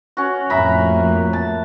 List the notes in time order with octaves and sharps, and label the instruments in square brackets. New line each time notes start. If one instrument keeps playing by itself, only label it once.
[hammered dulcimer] C#4 F#4
[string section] F2 A2 A#3 [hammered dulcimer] E5 A#5 B5
[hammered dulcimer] A5